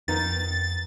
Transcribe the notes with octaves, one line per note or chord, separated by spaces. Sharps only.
F2 D#3 B3 D#4 A6